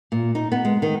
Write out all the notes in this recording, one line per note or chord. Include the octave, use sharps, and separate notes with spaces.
A#2
D#4
B3
G#3
D#3